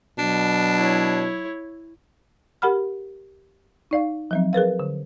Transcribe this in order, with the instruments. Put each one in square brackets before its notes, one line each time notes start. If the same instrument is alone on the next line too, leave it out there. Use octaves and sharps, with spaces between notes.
[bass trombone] B2 [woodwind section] F#3 [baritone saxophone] D4
[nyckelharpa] E4 C#5
[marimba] G4 A#4 F#5 B5 F6
D#4 D5 F5
F3 F#3 C4
G#4 A#4 B4 F5
D3